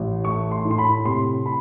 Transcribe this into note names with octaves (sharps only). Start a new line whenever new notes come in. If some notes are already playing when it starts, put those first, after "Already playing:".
Already playing: A1
A3 C#6
C6
A2
C6
B5
C3 C6
B5